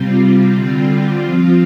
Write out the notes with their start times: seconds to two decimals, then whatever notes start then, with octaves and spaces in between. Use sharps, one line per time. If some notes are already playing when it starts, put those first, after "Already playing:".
Already playing: C3 G3 C4 F4
0.53 D3 G3 C4 F4
1.23 F3 C4 F4